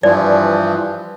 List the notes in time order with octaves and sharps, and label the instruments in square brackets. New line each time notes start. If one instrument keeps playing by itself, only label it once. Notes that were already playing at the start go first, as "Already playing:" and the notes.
[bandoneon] G2 E3 F3 [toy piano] D5